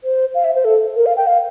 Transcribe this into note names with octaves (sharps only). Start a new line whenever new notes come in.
C5
F5
E5
C5
A4
A#4
F5
G5
F5